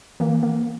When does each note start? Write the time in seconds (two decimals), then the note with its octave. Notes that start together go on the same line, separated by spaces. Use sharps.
0.20 E3 A#3
0.43 A#3